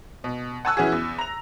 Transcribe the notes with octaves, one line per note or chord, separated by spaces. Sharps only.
B2
F#5 G#5 A5 C#6 E6 F#6
E3 C#4 F#4 G#4
E2
A#5 F7